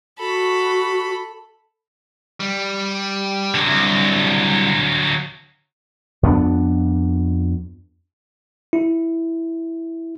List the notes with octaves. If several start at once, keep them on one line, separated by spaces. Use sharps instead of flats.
F#4 A4 B5
G3
D3 F#3
C2
F2 B3 C#4 D4
E4